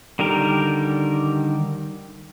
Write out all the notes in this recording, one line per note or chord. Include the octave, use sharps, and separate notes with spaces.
D3 D#3 G3 G4 A#4